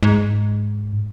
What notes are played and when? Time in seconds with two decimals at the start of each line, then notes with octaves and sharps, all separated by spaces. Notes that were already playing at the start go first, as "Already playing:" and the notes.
0.03 G#2